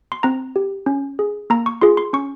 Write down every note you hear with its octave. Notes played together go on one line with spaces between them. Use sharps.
C6
C4 A#5
G4
C#4
G#4
A#3 A#5
C#6
F4 G#4 C6
C6
C#4 C#6